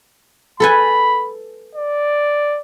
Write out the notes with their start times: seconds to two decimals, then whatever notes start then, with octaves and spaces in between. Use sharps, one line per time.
0.60 A4 B4 G#5 B5
1.75 D5